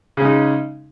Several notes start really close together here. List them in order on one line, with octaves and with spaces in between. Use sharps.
C#3 C#4 G#3 D#4